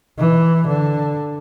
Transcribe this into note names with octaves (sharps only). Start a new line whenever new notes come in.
E3
D3